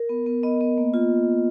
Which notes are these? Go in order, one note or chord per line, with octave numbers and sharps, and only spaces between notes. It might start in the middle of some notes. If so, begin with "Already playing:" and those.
Already playing: A#4
B3
B3
B3 D#5
B3
A#3
F4